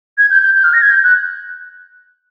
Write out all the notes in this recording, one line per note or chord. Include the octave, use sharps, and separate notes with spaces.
G#6
G6
G6
G6
F6
A#6
G#6
G6
F#6